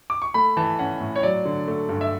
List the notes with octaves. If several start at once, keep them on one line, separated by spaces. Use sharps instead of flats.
D6
C#6
A3 B5
E3 A5
C#4 F#5
A2
C#5
F#3 D5
D3
A3
G2
E5